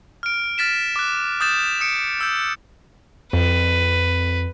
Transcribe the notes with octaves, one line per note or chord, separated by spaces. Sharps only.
F6 D7
F6 A6 B6 E7
D6 F#6
D#6 G6 A6 E7
D#6 C#7 D7
E6 G6
F2 B4